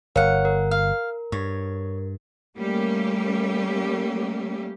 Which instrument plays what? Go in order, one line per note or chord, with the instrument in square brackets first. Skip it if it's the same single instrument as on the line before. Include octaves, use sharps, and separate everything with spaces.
[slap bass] G1 [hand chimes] A#4 C#5 [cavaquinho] F5 F#5
[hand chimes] A#4
[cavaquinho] F5
[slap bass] G2 [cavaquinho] C#5
[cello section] G3 A3 A#3 C#4 G4